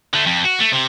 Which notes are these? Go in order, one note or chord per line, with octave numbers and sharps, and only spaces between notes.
D3 A3
F2
F#4
A3
C3